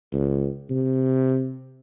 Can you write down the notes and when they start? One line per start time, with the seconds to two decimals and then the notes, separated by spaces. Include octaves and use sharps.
0.13 C#2
0.70 C3